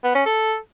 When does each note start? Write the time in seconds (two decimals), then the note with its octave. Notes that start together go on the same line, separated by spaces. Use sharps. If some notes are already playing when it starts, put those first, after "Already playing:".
0.04 B3
0.15 C#4
0.26 A4